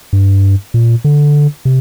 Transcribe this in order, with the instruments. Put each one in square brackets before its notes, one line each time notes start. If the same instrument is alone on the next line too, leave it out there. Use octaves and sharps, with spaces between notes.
[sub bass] G2
A#2
D3
C3